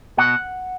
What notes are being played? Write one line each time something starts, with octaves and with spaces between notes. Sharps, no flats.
B2 F#5